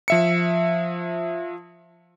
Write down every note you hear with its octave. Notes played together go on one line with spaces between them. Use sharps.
F3 E5 C#7